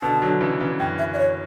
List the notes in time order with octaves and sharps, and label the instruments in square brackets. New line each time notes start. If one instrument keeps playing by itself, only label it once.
[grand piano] B2 D3 [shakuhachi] A5
[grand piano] D3 F#3
C#3 E3
C#3 E3
[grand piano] F#2 [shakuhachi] G5
[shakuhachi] E5
D5
C#5